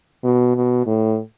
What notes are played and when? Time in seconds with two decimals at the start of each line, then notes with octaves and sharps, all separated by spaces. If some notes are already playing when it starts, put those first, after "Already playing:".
0.24 B2
0.56 B2
0.86 A2